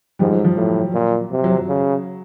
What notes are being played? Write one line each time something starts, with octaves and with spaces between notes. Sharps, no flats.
G#2 F3 G3
F#3
F3
A2 F#3
A#2
C3
F#3
F#3
C#3